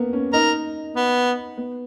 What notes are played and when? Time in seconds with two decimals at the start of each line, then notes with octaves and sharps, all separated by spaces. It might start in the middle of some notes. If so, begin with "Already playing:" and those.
Already playing: A#3 B3 C#4
0.13 C#4
0.33 D#4 A#4
0.96 B3
1.57 B3